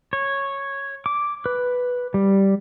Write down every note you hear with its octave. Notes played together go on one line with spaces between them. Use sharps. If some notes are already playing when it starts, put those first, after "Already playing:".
C#5
D6
B4
G3